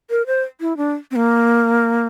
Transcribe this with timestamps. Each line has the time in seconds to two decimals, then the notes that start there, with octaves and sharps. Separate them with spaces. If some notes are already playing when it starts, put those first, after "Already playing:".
0.10 A#4
0.27 C5
0.61 E4
0.77 D4
1.11 C4
1.16 A#3